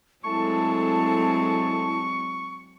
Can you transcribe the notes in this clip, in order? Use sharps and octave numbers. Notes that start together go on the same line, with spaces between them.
F#3 G#3 A3 C4 E4 A4 A5 C#6